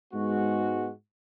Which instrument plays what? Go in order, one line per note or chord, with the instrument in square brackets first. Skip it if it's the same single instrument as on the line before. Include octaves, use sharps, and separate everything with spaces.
[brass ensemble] G#2 G#3 B3 F#4